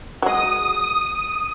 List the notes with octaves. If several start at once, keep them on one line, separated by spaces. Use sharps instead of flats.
F#3 G#3 D#6